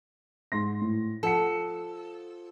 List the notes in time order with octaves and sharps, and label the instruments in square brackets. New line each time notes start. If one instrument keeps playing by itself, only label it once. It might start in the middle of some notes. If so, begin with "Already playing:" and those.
[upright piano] G#2 C6 A#6
A2
[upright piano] F3 F#5 C#7 [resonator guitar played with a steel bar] A4